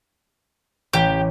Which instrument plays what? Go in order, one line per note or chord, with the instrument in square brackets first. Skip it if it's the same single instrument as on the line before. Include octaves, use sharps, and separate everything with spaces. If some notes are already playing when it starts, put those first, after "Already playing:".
[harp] A1 [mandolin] G4